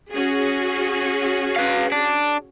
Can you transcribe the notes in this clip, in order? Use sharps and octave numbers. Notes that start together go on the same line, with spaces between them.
C#4 F#4 G#4
B4 F5
D4